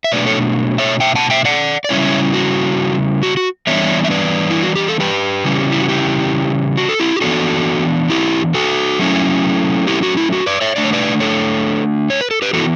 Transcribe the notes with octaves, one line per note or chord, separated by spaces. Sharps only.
E5
B2 F#3 A3 D4 B4 D5
A4 C#5
C#5 E5
E5 G5
F#5 A5
E5 G5
D5 F#5
D5
C#3 G3 C#4 E4 C#5 E5
F#4
F#4
F#4
E3 G3 B3 D4 C#5 E5
E5
B4 D5
E4
F#4
G4
A4
G4 B4
C#3 E3 G3 C#4
E4
F#4
E4 G4
F#4
A4
E4 G4
G4
E3 B3 D4 F#4 A4
E4 G4
F#4 A4
F#3 A3 C#4 E4
E4 G4
F#4
E4
F#4
B4 D5
C#5 E5
D3 A3 D4 D5
C#5
B4 D5
A4 C#5
C#5
B4
A4
G4 B4
E3 B3 E4 F#4 A4